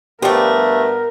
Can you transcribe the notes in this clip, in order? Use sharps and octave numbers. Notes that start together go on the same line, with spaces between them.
G2 F3 A3 B3 G4 A#4 D5 G5